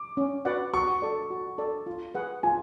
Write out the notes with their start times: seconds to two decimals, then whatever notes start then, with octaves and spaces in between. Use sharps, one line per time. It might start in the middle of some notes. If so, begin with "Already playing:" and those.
Already playing: D6
0.17 C#4
0.45 F#4 B4 D5 F#5
0.74 F#4 C#6
1.02 A4 D5
1.30 F#4
1.58 A4 D5
1.86 F4
2.15 G#4 B4 F#5
2.43 F4 G#5